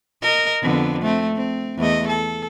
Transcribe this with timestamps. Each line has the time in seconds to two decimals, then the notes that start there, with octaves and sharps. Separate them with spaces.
0.22 A#4 D#5
0.62 F2 D3 B3
1.02 A3 C4
1.36 C4
1.78 E2 A3 D#5
2.08 A4